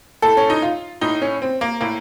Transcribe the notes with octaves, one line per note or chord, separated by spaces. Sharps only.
A2 A4
C#4
D#4
F4
A2 D#4
C#4
C4
A#3
A2 A#3